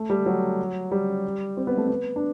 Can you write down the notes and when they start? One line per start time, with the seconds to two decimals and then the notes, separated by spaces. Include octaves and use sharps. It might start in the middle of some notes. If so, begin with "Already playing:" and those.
Already playing: A3
0.10 G3
0.26 F#3
0.91 G3
1.57 C4
1.67 B3
1.77 A3
1.88 B3
2.16 D4